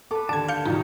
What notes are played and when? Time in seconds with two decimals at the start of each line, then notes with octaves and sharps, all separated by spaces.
0.11 A4 B4 D6
0.29 D#2 D3 A5 D6 G#6
0.48 F5 G6 C#7
0.65 A#1 E2 B2 D#4 F4 G4